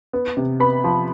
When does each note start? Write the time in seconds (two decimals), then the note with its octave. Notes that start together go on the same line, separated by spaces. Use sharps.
0.13 B3
0.37 C3
0.60 B3 B5
0.84 F3